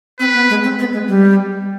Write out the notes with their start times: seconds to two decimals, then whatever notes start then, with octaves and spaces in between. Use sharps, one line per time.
0.20 C4 B4
0.34 B3
0.50 G#3
0.64 C4
0.79 B3
0.93 G#3
1.08 G3